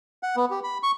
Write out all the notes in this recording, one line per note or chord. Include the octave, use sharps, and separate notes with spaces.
F#5
B3
G4
B5
C#6